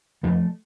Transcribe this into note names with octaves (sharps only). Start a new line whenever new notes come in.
F2 F3 A3